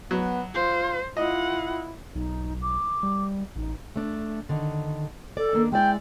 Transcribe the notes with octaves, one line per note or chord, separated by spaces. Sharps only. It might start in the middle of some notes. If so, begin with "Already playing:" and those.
F#3 B3
F4 C5
E4 F4 D#5 F#5
B1 D#4
D6
G3
A1 D#4
A3 D4
D3 D#3
A4 D5
D#3 A#3 D4
G#3 E4 D5 G5